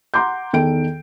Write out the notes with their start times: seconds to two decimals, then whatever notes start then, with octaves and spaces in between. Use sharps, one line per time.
0.14 F#5 A#5 C6 D6 G6
0.53 E2 D#3 A4 G5 D7